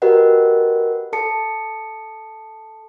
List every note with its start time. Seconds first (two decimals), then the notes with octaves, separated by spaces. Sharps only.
0.02 F#4 G4 A#4 B4 D#5 F#5
1.13 A4 A5 C#7